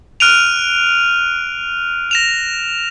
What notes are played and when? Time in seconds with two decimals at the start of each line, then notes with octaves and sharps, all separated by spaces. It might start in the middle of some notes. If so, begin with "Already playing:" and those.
0.20 F6 F#6 D7 D#7 F7
2.11 A#6 E7 F7